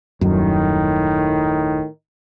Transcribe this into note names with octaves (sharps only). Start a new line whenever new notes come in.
D#1 F#2 A2 D#3